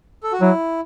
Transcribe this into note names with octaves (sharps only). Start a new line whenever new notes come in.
A4
F#4
F#3 E4